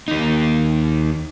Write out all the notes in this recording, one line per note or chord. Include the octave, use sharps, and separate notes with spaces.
D#2 D#4